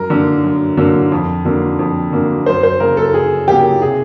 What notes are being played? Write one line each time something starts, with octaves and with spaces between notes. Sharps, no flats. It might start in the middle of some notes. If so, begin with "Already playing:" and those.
Already playing: F#2 A#4
D3 F#3 A#3
F#2
D3 F#3 A#3
F2
D3 F#3 A#3
F2
D3 F#3 A#3
F#2 C5
C5
C#3 F#3 A#3 A#4
A4
F#2 G#4
C#3 F#3 A#3 G4
C3 G#4